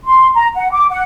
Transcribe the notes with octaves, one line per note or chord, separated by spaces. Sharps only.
C6
A#5
F#5
D6
F#5